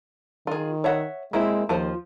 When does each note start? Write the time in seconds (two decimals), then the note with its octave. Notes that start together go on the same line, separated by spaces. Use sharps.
0.47 D#3 F4 G#4
0.84 C#5 E5 F#5
1.33 G#3 A#3 C4 E4
1.69 D#2 F3 F4 C5